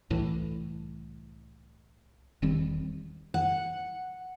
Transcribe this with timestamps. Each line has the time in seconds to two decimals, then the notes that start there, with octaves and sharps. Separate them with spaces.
0.10 C2 A2 E3
2.42 E1 D#3 G3 C4
3.34 F#5